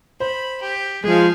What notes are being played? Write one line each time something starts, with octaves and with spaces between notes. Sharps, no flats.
C5 B5
G4
F3 G#3 G#4 F5